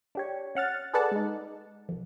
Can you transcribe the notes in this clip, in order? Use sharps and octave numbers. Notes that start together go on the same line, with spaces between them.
D4 G4 C#5
C#4 F#5 F6 A6
G#4 A4 B4 D5 F#5 A5
G#3 D#4
C2 F2